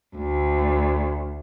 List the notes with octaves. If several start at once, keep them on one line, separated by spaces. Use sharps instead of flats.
D2